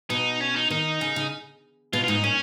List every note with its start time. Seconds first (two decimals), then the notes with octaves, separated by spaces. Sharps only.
0.10 B2 D#4
0.41 C#4
0.56 D#4
0.70 D#3 D#4
1.01 C#3
1.16 C#3
1.93 B2 F4
2.04 F4
2.08 G#2 D#4
2.24 A#2 C#4